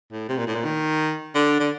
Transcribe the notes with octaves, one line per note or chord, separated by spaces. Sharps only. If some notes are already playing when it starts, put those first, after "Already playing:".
A2
C3
A#2
A2
A#2
D#3
D3
D3